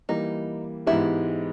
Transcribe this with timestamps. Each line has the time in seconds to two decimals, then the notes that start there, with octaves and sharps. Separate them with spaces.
0.09 E3 G3 A#3 D#4
0.86 G#2 E3 G#3 B3 E4 G4